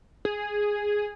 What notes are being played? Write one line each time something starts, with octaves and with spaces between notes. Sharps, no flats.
G#4